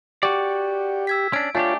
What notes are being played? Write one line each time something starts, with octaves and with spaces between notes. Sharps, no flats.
F#4 G4 D5 G5
E6 G#6 B6
C#4 D4 D7
A3 D4 F4 G4 C#5 G#5